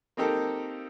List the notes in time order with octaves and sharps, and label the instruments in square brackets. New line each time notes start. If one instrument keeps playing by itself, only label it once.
[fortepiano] A#3 C4 D#4 G4 A4 A#4